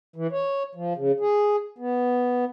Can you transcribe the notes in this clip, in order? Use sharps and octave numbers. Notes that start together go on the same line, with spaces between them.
E3
C#5
F3
C#3
G#4
B3